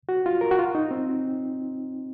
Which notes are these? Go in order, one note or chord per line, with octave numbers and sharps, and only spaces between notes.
F#4
F4
A#4
F#4
F4
D#4
C4